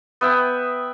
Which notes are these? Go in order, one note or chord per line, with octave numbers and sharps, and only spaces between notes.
B3 E5 G5